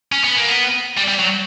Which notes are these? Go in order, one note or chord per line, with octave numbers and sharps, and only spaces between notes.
C#4
B3
A#3
B3
G3
G3
F#3